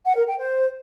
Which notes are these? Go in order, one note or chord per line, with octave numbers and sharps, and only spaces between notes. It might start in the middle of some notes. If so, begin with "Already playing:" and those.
F#5
A#4
G5
C5